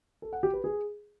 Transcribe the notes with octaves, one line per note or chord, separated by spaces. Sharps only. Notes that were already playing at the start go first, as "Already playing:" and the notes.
A4
F#5
G4
B4
G#4